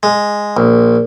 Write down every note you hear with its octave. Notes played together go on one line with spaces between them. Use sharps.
G#3
A#1